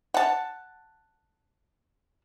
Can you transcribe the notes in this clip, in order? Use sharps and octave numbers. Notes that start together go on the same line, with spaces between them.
F#5 A5